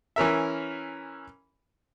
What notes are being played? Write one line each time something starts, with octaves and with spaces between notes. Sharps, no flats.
E3 C#4 A#4 E5